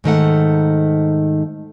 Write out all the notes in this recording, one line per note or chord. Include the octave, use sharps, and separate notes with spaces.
G#2 D#3 A3 F#5